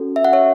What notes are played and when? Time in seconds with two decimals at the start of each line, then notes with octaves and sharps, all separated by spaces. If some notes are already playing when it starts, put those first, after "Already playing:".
Already playing: C#4 F#4 A4
0.16 E5
0.25 F#5
0.33 C#5 E5